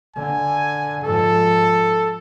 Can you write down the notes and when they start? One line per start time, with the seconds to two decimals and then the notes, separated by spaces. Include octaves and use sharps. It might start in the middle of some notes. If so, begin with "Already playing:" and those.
0.16 D3 G#5
1.04 G#2 F3 A4